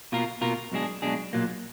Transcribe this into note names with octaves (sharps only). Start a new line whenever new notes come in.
B2 A#3 F4 A#4
B2 A#3 F4 A#4
B1 B2 G#3 D4 G#4
B1 B2 G#3 D4 G#4
B1 A#2 F#3 A#3